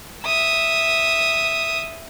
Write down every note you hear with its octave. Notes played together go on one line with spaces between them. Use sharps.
E5 D#6